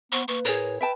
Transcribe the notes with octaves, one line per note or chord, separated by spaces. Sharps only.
B3 C5 C#6
A#3 B4 C#6
A2 G#4 A#4 C#5
B4 E5 G5 A5